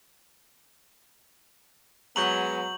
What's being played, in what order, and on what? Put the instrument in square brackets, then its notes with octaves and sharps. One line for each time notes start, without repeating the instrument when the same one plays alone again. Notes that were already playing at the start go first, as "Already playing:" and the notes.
[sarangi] F#3 [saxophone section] G#3 B3 [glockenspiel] A#5 C#6 G6 [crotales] F#7